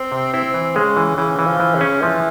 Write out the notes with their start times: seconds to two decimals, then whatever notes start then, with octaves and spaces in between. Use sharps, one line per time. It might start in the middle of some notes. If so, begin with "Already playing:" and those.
Already playing: C4
0.12 C3
0.33 C4 E4
0.54 E3
0.76 C#3 G#3
0.97 E3
1.17 C#3 E3
1.39 E3
1.46 F3
1.60 E3
1.75 C#3
1.81 C#4
2.02 E3 F3